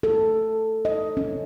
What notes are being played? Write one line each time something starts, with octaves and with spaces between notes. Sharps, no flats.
A4
D#5
C#4